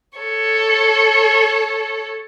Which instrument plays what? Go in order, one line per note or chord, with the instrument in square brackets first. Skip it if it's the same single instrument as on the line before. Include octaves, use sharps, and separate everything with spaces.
[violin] A4 C#5